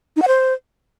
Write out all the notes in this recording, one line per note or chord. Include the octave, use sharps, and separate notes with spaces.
D#4
F#5
C5